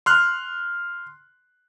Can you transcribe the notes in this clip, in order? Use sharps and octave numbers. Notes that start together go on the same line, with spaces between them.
C6 F6 F#6